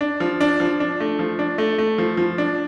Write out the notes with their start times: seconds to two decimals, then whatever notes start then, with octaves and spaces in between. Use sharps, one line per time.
0.01 D4
0.20 F3
0.41 D4
0.60 F3
0.80 D4
1.00 A3
1.19 F3
1.39 D4
1.58 A3
1.78 A3
1.98 F3
2.17 F3
2.38 D4